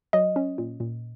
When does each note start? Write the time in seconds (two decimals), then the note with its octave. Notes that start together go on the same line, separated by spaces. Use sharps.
0.13 F#3 D#5
0.36 C#4
0.58 A#2
0.80 A#2